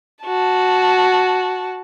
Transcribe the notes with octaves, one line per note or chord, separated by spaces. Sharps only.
F#4 A5